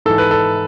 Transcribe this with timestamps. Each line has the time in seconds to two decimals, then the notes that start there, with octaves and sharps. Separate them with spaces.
0.05 G#2 E3 A4
0.18 B4
0.31 A4